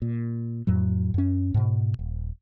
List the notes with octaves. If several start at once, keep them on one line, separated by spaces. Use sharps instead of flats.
A#2
F2 A2 F#3
F#2 C#4
G#2 B2
D#1